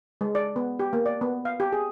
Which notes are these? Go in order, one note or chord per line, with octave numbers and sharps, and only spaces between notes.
G#3
D5
B3
G4
A#3
D5
B3
F5
G4
G#4